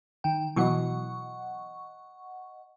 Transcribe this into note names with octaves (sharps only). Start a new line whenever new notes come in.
D#3 G5
B2 E3 F#3 D#5 F#5 C#6